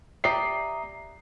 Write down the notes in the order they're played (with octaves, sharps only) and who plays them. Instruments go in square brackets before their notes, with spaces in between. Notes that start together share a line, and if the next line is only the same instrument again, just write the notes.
[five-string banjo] G4 D5 [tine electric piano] E5 A#5 D#6 [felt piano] C7